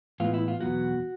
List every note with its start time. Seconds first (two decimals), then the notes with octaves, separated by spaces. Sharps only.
0.20 A2 E3 G#3 B3 F4
0.34 E4
0.48 F4
0.61 E2 B2 F#3 B3 F#4